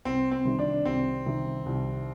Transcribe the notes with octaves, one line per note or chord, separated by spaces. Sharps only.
C2 C4
C4
C3 D#3 G3
D4
C2 C4
C3 D#3 G3
C2